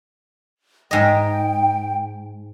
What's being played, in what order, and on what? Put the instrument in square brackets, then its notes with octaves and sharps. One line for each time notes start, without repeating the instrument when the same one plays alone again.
[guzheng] G#2 D#5 [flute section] G5